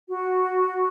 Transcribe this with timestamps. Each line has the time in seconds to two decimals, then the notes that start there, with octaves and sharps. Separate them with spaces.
0.09 F#4